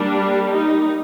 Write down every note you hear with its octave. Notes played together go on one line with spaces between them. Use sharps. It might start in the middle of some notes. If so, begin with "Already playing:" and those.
Already playing: G3 A#3 D4
D#4